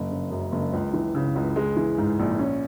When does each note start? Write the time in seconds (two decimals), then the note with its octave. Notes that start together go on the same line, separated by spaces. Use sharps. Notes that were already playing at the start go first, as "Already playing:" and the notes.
Already playing: F#1
0.10 C#3
0.31 F#2
0.52 F#1
0.73 C#2
0.93 E3
1.15 C#3
1.35 C#2
1.56 G#3
1.76 E3
1.98 G#2
2.19 A#1
2.39 C#4